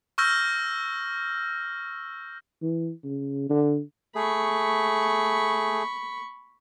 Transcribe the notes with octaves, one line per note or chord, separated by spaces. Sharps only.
C#6 E6 F6 G6 A#6
E3
C#3
D3
A3 G#4 B5 C#6